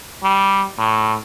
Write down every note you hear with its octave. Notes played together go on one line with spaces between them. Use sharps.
G3
A2